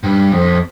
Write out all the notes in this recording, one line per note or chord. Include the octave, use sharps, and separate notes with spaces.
G2
F2